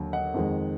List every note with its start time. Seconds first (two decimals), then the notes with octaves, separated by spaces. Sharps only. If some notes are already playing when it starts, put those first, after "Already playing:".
Already playing: D#2 D3 F#3
0.13 D#5 F#5
0.34 F2 D#3 G#3